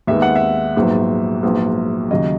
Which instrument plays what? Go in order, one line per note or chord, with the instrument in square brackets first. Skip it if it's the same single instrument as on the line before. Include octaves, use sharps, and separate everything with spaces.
[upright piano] D#2 D#3 G#3 B3 E5
F#5
E5
A#1 G#2 F#3 B3
A#1 G#2 F#3 B3
D#2 C#3 F#3 D#5